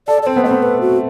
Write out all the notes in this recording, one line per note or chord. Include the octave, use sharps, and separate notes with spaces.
A4 D5
A4
D5
C4 C5
B3
A3 C5
B3
B4
F#4